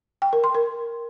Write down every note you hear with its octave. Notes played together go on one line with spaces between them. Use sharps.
G5
A#4
C6
A#4